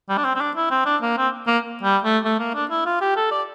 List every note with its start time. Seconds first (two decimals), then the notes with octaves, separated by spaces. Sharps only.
0.09 G3
0.17 D4
0.24 C4
0.35 C4
0.41 D4
0.56 E4
0.71 C4
0.86 D4
1.02 A#3
1.17 C4
1.47 A#3
1.83 G3
2.04 A3
2.24 A3
2.39 A#3
2.54 D4
2.70 E4
2.86 F4
3.01 G4
3.16 A4
3.31 D5